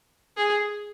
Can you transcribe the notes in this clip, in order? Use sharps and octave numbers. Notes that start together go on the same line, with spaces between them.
G#4